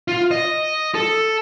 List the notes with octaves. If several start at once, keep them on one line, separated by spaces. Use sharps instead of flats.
F4
D#5
A4